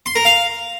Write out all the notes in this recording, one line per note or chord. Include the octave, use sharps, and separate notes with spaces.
C6
A#4
F5